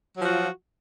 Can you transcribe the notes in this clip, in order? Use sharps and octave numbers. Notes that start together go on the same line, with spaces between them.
F3 F#3 F4 F#4